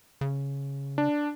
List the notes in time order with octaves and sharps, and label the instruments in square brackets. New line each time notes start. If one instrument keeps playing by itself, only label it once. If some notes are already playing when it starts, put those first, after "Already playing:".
[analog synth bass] C#3
[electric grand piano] D4